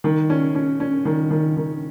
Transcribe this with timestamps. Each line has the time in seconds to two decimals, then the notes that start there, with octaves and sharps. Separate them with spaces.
0.04 D#3
0.30 C#4
0.55 C#4
0.80 C#4
1.05 D#3
1.31 D#3
1.57 D#3